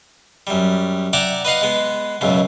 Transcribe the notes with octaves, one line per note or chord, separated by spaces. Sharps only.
F#2 G3
D5 E5 F#5 G5 A#5 D6
B4 D#5 F5 F#5
G#3 B3
C#2 F#2 B2